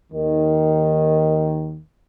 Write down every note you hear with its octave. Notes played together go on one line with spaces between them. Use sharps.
D#2 D#3